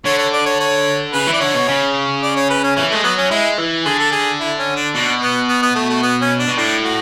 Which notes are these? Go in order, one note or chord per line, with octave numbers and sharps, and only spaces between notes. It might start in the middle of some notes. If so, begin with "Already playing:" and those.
D3 C#5
C#5
D5
C#5
C#5
C#3 B4
E3
D5
D3 C#5
B2
C#3
D5
C#5
B4
C#4
E3 C#4
G#3 A3
F#3 B3
C#4
G#3 E4
E3
D3 G#4
A4
G#4
E4
C#4
D4
B2 D4
B3
B3
B3
A3
A3
B3
C#4
D4
B2
A2 D4
F#4